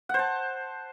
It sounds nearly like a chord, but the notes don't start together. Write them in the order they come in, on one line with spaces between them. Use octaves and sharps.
F#5 C5 A5